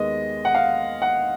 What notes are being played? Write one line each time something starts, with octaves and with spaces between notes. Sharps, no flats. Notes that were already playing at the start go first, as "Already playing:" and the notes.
Already playing: D#2 D#3 G#3 B3 D#5
F#5
F5
F#5